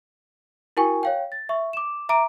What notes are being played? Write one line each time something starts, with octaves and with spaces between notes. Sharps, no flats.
E4 F#4 A#4 G5 G#5 C#6
C#5 F5 G5
A6
E5 C#6
D6 E7
E5 A#5 D6 D7